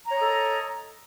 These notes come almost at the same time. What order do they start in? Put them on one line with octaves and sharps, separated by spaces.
A#5 C#5 D#5 A4